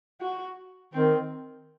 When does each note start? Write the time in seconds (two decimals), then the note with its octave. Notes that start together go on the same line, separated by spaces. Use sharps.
0.21 F#4
0.93 D#3 C4